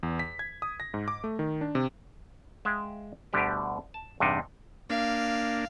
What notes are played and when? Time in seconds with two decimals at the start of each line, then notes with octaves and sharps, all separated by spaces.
0.03 E2
0.19 B6
0.39 G#6
0.62 D#6
0.80 A#6
0.94 G#2
1.08 D6
1.24 A3
1.39 D#3
1.61 D4
1.75 C3
2.65 G#3 E5 F5 G5
3.33 D2 B2 D3 G3 G4 B4
3.94 A5
4.20 E2 G2 C3 D4 D#4
4.90 A#3 D4 F5